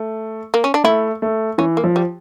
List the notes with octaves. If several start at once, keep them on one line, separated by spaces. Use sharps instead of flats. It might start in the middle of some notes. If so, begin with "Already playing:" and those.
Already playing: A3
A#3
C#4
D4
A3 E4
A3
E3 C#4
A#3
F3
G3